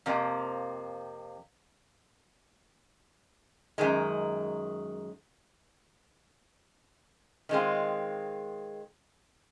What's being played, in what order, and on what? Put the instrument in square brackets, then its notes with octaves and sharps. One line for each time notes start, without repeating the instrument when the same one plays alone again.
[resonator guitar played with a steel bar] F2 C3 F3 A#3
F#2 D#3 G#3
D#3 G#3 C4 F4